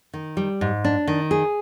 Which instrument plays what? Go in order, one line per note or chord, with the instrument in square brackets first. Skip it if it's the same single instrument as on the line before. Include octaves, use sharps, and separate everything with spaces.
[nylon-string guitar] D#3
G3
G#2
D4
D#3
G#4